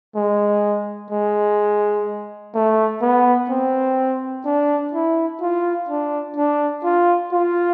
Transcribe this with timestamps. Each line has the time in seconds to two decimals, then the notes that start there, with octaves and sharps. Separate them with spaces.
0.15 G#3
1.11 G#3
2.54 A3
3.02 B3
3.49 C4
4.45 D4
4.93 E4
5.41 F4
5.89 D4
6.36 D4
6.84 F4
7.32 F4